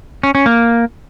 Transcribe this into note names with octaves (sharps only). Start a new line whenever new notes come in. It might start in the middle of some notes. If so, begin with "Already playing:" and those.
C#4
C#4
A#3